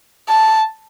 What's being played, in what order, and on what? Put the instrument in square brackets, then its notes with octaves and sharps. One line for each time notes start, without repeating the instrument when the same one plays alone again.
[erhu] A5